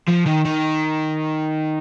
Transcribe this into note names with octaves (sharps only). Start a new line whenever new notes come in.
F3
D#3
D#3